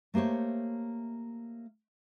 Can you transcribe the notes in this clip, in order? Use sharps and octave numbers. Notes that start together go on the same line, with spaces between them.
A3 A#3 G4 C5 C#5